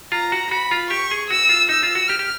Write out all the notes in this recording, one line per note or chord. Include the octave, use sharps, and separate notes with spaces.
F4 A#5
F#4
F#4 B5
F4
G4 C#6
G#4
F#4 E6
F4
D#4 E6
F4
F#4
G4 F6
G4